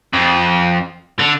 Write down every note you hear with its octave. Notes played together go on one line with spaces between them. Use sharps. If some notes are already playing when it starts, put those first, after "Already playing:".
F2
D3